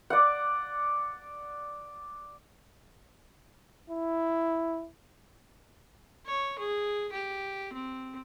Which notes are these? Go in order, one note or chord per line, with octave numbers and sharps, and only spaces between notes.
D5 F#5
E4
C#5
G#4
G4
C4